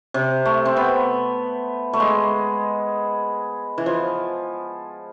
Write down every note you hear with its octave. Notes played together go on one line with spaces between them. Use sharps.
C3
A3
C4
B3
A3
G#3
E3
F3